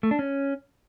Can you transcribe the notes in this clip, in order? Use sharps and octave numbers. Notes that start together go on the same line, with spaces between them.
A3
D4
C#4